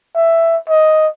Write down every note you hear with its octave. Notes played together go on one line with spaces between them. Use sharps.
E5
D#5